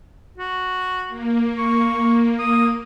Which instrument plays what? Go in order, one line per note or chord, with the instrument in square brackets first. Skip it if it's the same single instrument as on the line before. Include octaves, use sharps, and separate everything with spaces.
[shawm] F#4
[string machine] A#3
[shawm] C#6
D#6